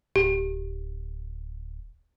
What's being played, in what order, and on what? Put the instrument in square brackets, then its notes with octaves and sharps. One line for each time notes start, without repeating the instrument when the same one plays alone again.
[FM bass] D1 [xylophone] G4